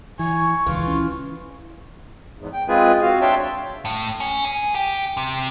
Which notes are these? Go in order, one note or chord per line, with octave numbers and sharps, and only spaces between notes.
E3 G#5 C#6
D#1 C#2 E3 F4
C#4
E2 G#2
G5
G#3 C4 F4 G#4 B4 G#5
C4 F#4 F5
D4 C#5 E5 G5 A5 C6
A2
C#4
G#4
G4
C3